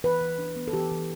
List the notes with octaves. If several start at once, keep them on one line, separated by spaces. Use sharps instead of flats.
E3 B4
E3
D4
B3
A4
E3 G4
E3